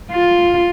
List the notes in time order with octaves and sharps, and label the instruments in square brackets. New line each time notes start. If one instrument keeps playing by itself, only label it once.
[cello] F4